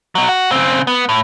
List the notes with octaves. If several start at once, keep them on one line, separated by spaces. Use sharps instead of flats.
B2 F#3
F#4
C#3 C4
B3
A2